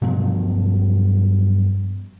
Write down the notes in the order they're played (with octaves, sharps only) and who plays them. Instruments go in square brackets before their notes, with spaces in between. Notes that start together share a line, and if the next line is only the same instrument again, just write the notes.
[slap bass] G2 B2 F3 F#3